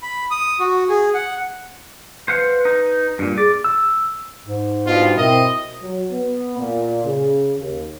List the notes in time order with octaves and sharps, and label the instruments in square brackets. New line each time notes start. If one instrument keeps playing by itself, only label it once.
[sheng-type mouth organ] B5
D#6
F#4
G#4
F#5
[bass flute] B4 [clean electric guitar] C5 F5 F#5
[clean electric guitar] D#4
G2 A#2
[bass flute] G#4 [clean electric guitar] D5
[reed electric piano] E6
[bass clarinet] G#2
[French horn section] G2 B2 [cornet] F4
[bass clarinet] B2 [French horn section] C4 E4 A#4 [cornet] D#5
[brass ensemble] F#3
B3
A#2
C#3
D#2